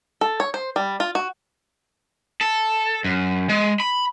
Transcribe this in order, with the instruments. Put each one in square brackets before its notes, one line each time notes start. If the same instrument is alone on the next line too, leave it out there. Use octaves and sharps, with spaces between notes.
[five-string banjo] A4
C#5
C5
G3
F4
F#4
[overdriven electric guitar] A4
F#2
G#3
B5